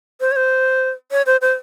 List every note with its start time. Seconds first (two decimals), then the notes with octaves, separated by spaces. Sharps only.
0.20 C5
0.31 C#5
0.36 C5
1.11 C#5
1.26 C5
1.41 C5